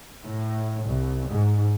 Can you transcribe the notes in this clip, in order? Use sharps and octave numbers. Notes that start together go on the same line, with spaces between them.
A2
C2
G#2